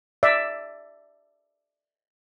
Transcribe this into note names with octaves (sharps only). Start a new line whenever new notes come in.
D5 E5